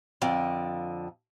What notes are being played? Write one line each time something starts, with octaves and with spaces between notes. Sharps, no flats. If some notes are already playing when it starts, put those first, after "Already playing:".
F2 D3